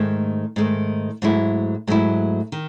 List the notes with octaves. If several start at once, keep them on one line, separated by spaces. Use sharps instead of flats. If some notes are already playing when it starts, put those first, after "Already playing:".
Already playing: G#2 D#3 A3
G#2 D#3 A3
G#2 F#3 A3 E4
G#2 F#3 A3 E4
D#3